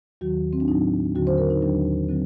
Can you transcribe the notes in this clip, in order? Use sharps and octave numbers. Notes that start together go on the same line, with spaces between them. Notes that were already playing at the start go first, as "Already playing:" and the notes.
D#2 D#3 F#3 F#4
C4
D4
A2 F#3 D#4
D#2 D3 F#3 F#4
C5
A#4
D#4
D#2 D#3 F#3 D4
D3 F#3 C4